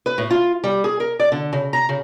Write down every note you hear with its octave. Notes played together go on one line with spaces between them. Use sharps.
B4
A2
F4
G3
G#4
A#4
D5
D3
C#3
A#5
C#3